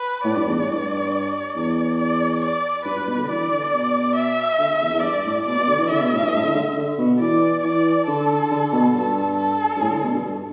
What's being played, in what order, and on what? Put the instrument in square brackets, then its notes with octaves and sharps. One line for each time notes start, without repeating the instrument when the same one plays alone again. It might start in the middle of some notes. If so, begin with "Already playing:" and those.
Already playing: [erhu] B4
[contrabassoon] A2 [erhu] D5
[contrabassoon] G2
E2
A2
G2
E2
[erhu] D5
D5
[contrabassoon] G2 [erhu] B4
[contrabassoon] G2
B2
D3
[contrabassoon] E3 [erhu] D5
[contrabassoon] D3
B2
[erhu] E5
[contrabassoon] D3
D3
E2
E2
[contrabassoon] G2 [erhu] D5
[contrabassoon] A2
[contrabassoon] B2 [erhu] D5
[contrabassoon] B2
D3
E3
[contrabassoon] D3 [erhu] E5
[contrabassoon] B2
A2
G2
A2
D3
D3
D3
B2
[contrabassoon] E3 [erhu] D5
[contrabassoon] E3 [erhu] D5
[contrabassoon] D3 [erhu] A4
[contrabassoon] D3
B2
[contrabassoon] G2 [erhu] A4
[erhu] A4
[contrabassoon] G2
A2
D3
B2
G2
G2